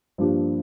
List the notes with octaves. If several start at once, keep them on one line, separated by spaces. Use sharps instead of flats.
G2 F3 A#3 D4 G4